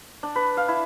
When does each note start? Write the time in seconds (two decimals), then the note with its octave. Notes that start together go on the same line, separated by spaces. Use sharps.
0.23 D4
0.36 B4
0.57 F5
0.68 E4